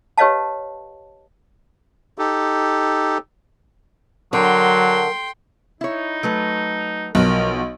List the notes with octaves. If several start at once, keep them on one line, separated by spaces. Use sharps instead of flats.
G4 B4 C#5 D#5 F5 A5
D#4 G4 A4
D3 F#3 A#4 G5 C6
D#4 E4 C#5
F#3 A3 B4
B1 F3 F#4 A#4